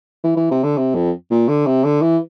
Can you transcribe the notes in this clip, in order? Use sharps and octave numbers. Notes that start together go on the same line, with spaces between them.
E3
E3
C3
D3
C3
F2
A#2
D3
C3
D3
E3